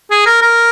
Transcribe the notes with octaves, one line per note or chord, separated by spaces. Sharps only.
G#4
A#4
A#4